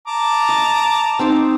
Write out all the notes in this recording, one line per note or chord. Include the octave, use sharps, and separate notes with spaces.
A5 A#5 D6
D#5
C4 D#4 C5